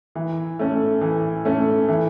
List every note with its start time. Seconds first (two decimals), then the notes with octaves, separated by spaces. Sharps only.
0.15 E3
0.59 A3 C#4
1.01 E3
1.45 A3 C#4
1.88 E3